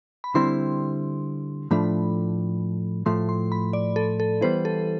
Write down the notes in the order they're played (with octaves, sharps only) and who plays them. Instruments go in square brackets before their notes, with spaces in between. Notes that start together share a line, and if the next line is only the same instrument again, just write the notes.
[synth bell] B5
[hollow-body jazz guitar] D3 G3 C4 E4 [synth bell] C6
[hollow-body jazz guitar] A2 F3 A3 D4 [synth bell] B5
[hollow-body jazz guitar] A2 F3 A3 [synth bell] C6
[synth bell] C6
B5
D5
A4
A4
[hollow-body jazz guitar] E3 G3 B3 E4 [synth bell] C5
[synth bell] A4